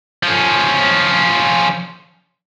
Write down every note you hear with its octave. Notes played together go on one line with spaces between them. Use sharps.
F3 C#4